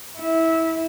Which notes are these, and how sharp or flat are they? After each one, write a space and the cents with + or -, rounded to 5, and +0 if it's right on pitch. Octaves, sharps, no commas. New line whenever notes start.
E4 -20